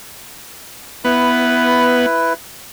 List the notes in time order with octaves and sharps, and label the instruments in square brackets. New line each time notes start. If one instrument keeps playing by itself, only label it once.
[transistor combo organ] B3 [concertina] E4 B4